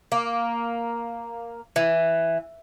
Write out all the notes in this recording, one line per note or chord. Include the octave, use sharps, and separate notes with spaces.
A#3
E3